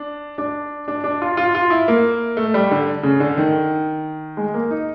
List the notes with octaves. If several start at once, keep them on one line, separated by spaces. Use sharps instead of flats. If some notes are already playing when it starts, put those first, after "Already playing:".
Already playing: D4
D4
D4
D4
F4
F4
F4
E4
A#3
A3
G3
D3
C#3
D3
D#3
G#3
A#3
D#4